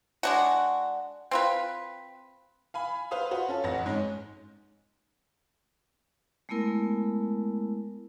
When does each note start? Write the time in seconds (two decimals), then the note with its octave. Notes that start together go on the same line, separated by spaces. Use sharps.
0.23 G#3 D4 F#4
1.31 C4 F4 B4
2.74 F5 G#5 B5
3.11 B4 C5 F5 D#6 F7
3.31 F4 F#4 B4 C5
3.49 C#4 F4 A4
3.64 A1 F2 F#5 A#6
3.86 G#2 G#3 C#4
6.49 G#3 A3 B3 E4 A#4